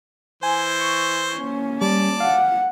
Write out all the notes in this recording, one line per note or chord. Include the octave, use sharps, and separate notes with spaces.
E3 C5 G#5
C#6
A#3 C#4
G3 D5 A5
F5 F#5